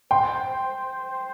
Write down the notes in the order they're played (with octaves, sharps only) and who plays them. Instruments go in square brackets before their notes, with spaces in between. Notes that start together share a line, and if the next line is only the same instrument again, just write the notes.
[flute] C5 [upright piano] G5 C6